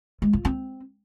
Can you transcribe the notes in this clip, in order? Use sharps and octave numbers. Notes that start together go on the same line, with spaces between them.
G#3
F4
C4